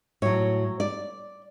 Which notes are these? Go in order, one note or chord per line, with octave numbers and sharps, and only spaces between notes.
A2 F#3 C#5
D5